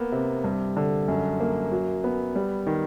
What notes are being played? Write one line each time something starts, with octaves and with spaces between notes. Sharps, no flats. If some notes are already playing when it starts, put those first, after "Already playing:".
Already playing: A#3 B3
C3
G2
D3
F#2
A#3
F#3
B3
G3
D#3